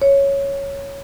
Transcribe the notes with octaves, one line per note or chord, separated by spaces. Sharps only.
C#5